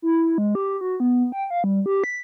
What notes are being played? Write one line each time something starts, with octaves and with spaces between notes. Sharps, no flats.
E4
G#3
G4
F#4
B3
G5
F5
G3
G4
B6